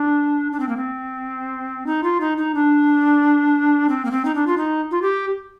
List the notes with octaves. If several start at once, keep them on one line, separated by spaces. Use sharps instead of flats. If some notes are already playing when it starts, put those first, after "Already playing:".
Already playing: D4
D4
C4
A#3
C4
D#4
F4
D#4
D#4
D4
C4
A#3
C4
D#4
D4
F4
D#4
F4
G4